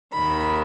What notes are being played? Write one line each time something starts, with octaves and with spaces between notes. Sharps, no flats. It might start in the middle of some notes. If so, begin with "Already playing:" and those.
D#2 D#3 B5